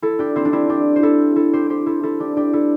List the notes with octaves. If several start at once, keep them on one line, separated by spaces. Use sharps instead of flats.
E4 A4
D4 G4
C4 E4
D4
C4 E4
D4 G4
C5
E4 A4
E4 A4
G4 C5
G4 C5
E4 A4
E4 A4
D4 G4
D4 G4
E4 A4